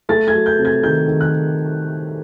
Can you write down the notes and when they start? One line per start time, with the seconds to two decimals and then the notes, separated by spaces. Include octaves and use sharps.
0.09 A3 A6
0.28 G#6
0.33 F#3
0.46 G6
0.59 C3
0.65 G#6
0.83 D#3 G6
1.08 D#3
1.21 F#6